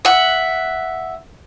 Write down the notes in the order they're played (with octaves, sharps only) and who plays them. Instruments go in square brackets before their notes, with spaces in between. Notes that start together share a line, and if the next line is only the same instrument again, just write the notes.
[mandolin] E5 F#5